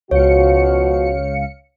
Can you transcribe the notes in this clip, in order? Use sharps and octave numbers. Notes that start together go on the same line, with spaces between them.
C#2 B2 F3 F#4 C#5 F5 C#7